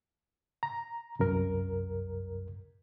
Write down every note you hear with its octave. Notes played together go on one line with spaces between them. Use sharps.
A#5
C2 F#2 A#4